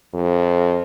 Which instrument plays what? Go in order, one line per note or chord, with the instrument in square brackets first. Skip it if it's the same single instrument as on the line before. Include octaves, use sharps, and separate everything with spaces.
[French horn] F2